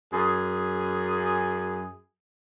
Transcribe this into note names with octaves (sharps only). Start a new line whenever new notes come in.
F#2 G#4